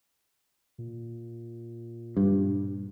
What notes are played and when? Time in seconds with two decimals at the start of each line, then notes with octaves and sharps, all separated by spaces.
0.78 A#2
2.17 G2